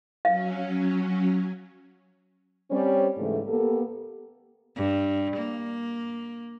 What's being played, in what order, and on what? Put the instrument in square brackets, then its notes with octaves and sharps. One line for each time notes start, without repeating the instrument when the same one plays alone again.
[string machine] F#3 C#4 [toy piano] F5
[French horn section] G3 C4 C#4
G#2 C#3 E3 A3
A#3 B3 G4 A4
[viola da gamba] G2
A#3